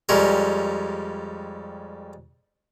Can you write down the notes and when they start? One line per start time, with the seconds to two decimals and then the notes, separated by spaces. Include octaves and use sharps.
0.09 F2 G3 G#3 C#4 A#4